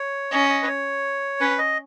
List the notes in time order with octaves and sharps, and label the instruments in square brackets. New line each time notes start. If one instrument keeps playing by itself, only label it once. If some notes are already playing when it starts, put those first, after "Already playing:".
Already playing: [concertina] C#5
[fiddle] C#4 [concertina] D#5
[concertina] D#5
B4
C#5
[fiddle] C#4 [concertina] B4
[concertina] D#5